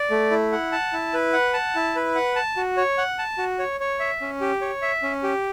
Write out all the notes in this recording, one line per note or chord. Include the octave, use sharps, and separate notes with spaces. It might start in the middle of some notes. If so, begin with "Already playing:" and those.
Already playing: D5
A3
E4
F#5
A5
E4
B4
F#5
A5
E4
B4
F#5
A5
F#4
C#5
F#5
A5
F#4
C#5
C#5
E5
C#4
G4
C#5
E5
C#4
G4